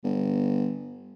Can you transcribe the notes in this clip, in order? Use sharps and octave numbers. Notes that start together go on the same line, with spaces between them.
G1